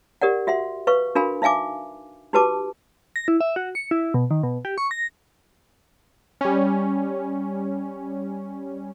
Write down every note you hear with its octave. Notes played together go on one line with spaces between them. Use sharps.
G4 A#4 D5 F#5
F#4 E5 F#5 C6
B4 F5 C#6
D4 F#4 A#4 F5 G#5 B5
D#4 E5 F5 G#5 D6
D#4 F#4 G4 B4 A5 D6
A#6
E4
E5
F#4
C#7
E4
B2
D#3
B2
G4
C#6
A#6
G3 C#4